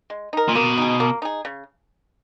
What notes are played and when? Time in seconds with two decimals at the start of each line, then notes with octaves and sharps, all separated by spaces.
0.10 G#3
0.33 D#4 A#4
0.48 A#2
0.55 B2 A#3
0.78 D#4 G#4
1.00 A#3
1.22 D#4 G#4
1.45 C#3